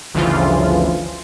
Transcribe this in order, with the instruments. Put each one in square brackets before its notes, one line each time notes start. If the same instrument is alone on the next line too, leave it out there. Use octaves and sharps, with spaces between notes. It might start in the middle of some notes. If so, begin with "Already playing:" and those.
[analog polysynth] G1 D2 C#3 E3 F3 F4